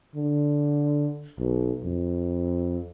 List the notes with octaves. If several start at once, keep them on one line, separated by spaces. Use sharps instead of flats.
D3
B1
F2